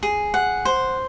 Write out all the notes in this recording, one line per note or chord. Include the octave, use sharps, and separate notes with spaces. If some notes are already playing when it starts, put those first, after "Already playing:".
G#4
F#5
C5